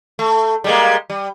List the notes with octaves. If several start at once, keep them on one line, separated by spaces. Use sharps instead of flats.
A3
G3 G#3 A#3
G3